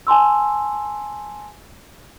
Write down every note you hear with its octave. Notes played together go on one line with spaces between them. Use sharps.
G#5 A5 C6 E6